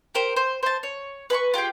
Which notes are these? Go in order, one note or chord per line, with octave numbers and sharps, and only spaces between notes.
G4 A#4 C5
C5
C5 A5
C#5
B4 G#5 C6 C#6
F4 G4 G#4 G5